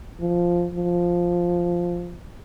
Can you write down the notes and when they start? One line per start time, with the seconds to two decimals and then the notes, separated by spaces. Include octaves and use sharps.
0.21 F3
0.74 F3